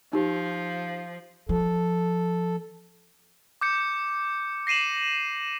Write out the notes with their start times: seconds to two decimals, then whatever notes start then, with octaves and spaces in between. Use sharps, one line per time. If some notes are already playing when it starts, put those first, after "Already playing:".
0.13 F3 D#4 G4
1.49 F3 A4
3.61 D6 G6 C#7
4.67 A#6 C7 D#7 E7 F#7